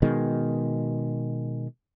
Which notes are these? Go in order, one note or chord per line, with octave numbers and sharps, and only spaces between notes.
B2 D#3 G#3